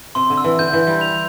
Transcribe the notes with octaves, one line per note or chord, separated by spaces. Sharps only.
C3 C6
D3
E6
E3
D3 G6
E3
G6
G3
F7